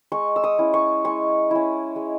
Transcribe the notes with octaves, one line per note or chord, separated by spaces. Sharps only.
G#3 C#6
E6
D#6
C#4 E4
C#6
G#3 C#6
C#4 E4
G#3